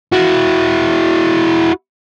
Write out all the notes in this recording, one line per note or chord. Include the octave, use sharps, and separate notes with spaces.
E4 F#4